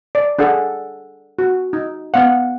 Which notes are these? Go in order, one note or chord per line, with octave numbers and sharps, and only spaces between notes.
D5
D4 G#4 A4 F#5
F#4
D#4
B3 F5 F#5